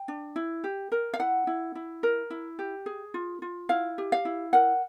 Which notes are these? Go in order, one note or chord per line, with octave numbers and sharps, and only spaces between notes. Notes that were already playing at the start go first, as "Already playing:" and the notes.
Already playing: G5
D4
E4
G4
A#4
F5
E4 F#5
E4
E4
A#4
E4
G4
G#4
F4
F4
E4 F5
G4
F5
E4
A#4 F#5